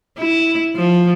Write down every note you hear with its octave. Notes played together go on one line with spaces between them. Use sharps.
E4
F3